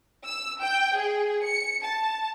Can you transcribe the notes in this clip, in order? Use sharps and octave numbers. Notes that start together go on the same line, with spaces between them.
E6
G5
G#4
C#7
A5